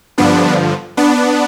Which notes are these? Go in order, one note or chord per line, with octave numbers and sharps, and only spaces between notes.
G2 D3 F3 B3 D4
B3 D4